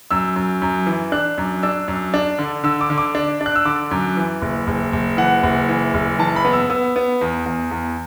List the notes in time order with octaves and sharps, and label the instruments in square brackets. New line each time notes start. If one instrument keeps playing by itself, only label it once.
[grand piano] F#2 E6
F#2
F#2
E3
D4 F#6
F#2
D4 E6
F#2
D4
D3
D3 E6
D6
D3
D6
D4
D4
F#6
E6
D3 D6
F#2
E3
F#1
F#1
F#1
E3 F#5
F#1
E3
F#1
E3 A5
B5
B3
E6
B3 E6
B3
E2
E2
E2